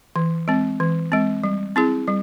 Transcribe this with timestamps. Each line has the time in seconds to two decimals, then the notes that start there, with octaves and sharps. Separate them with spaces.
0.16 E3
0.48 G#3 C4
0.80 E3
1.12 G#3 C4
1.44 G3
1.76 C4 E4 G#4
2.07 G3